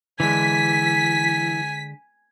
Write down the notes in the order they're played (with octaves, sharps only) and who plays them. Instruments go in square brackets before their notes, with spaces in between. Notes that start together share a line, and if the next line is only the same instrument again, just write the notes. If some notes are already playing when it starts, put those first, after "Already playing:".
[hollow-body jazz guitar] D3 G#3 [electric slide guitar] E3 [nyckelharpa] G#5 [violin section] B6